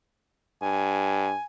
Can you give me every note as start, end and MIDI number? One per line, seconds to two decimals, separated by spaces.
0.62 1.33 43
0.62 1.46 80